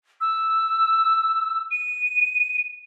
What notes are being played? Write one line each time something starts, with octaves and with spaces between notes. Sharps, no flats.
E6
D#7